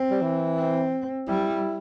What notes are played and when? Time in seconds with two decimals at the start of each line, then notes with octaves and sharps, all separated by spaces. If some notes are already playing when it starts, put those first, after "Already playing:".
Already playing: C4
0.10 G3
0.22 E3
0.58 C4
1.28 G3 E4